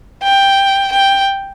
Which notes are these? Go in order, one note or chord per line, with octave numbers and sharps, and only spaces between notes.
G5
G5